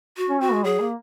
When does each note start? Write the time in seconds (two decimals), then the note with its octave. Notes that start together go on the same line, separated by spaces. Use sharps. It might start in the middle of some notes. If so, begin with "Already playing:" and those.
0.17 F#4
0.29 C#4
0.41 C4 F#4
0.52 G#3
0.64 F#3 G#4
0.80 A#3